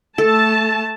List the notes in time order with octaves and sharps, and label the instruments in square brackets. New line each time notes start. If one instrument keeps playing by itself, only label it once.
[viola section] A3 A5 [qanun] A4